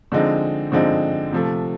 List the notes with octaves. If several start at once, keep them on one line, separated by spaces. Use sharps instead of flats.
D3 F3 G#3 C4 D#4
D3 F3 G#3 C4 D#4
C3 F3 A3